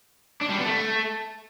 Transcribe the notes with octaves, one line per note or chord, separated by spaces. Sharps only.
D4
G3
B3
A3